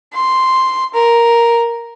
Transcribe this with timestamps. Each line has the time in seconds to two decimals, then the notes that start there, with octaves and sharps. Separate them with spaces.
0.13 C6
0.94 A#4